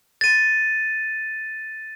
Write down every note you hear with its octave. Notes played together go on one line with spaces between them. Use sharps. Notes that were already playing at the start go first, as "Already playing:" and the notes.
A6 D#7